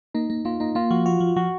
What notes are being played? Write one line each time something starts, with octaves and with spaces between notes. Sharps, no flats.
A#3 D#4
A#3
A#3 F4
A#3 D#4
A#3 F4
F3 F#4
F4 F#4
F3
F3 F#4